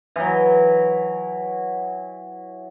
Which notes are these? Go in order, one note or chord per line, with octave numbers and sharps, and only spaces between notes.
E3 F#3